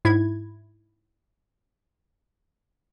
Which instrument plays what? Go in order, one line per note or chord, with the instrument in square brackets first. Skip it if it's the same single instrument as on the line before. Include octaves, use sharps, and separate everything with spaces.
[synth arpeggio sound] G#2 E4 G#6